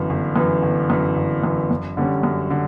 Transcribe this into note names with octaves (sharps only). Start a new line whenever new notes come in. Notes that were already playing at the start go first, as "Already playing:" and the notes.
Already playing: G1 F#2 E3
G1
F#2 E3
G1
F#2 E3
G1
F#2 E3
F#2
D3 G3 C#4
F#2
D3